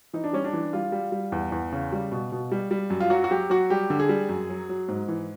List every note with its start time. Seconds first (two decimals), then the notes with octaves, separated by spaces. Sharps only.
0.13 E3 D#4
0.24 D4
0.33 G3 C#4
0.45 D4
0.53 E3
0.73 G3 F4
0.92 G3
1.12 G3
1.32 E2
1.52 E2
1.72 C#3
1.92 G3
2.12 B2
2.32 B2
2.52 G3
2.71 G3
2.90 F#2
3.00 F4
3.10 F#3 F#4
3.24 F#4
3.31 F#3 G4
3.50 F#3 F#4
3.70 G3 G4
3.90 D3
4.00 G#4
4.09 G3
4.29 F#2
4.50 F#3
4.69 F#3
4.88 G#2
5.08 E3